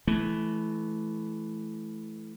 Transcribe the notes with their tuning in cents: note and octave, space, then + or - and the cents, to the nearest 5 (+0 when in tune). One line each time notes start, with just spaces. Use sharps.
E3 +0 A3 -30